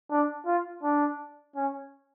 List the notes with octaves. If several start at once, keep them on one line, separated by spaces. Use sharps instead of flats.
D4
F4
D4
C#4